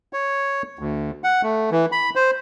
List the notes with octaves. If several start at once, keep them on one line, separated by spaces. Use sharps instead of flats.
C#5
D2
F#5
A3
E3
B5
C5